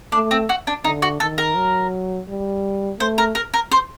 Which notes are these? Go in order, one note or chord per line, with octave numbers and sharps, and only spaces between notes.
A3 D4
C4
F#4
D4
D3 D#4
F#4
D#3 A4
A#4
F#3
G3
A3 C5
A#4
A#4
A#4
C5